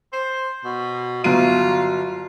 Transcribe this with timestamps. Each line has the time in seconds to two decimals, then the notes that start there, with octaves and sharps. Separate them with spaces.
0.13 C5
0.65 B2
1.24 G1 F#3 F4 D#7